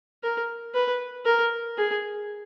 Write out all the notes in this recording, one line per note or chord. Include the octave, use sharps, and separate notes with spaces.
A#4
B4
A#4
G#4